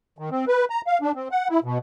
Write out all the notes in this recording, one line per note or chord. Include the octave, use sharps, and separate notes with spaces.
D#3
C4
B4
A#5
F5
D4
C4
F#5
E4
B2